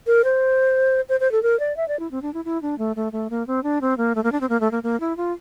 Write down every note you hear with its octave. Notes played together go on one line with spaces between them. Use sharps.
A#4
C5
C5
C5
A4
A#4
D5
E5
D5
E4
C4
D4
E4
E4
D4
A3
A3
A3
A#3
C4
D4
C4
A#3
A3
A#3
D4
C4
A#3
A3
A#3
A#3
E4
F4